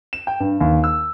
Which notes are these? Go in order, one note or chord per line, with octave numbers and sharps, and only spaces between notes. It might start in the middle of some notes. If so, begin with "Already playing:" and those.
E7
G5
G2
D#2
E6